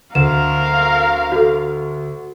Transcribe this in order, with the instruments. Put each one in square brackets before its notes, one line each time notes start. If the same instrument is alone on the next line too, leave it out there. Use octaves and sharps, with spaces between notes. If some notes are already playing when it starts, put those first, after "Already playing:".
[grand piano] D2 [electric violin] A#4 F5 [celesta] E7
[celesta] F#4 A4